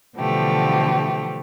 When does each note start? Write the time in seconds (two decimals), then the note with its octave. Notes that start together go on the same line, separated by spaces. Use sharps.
0.17 B2 D3 E3 F3 A3 G4